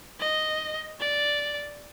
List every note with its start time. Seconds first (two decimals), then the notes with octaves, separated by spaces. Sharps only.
0.20 D#5
1.00 D5